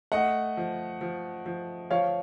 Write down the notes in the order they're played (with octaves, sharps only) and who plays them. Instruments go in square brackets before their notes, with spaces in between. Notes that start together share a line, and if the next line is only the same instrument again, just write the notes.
[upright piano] A3 [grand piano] D#5 F#5
[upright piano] F3
F3
F3
[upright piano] F3 [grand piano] C#5 F5